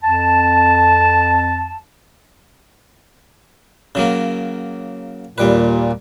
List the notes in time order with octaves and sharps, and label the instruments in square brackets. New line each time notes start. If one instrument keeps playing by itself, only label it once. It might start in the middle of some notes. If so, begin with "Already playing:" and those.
[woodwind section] F2 A5
[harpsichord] C#3 F#3 A#3
[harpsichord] D#2 G3 B4 [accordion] A#2